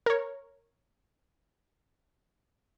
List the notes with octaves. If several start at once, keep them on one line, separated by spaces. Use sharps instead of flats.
A#4 C#5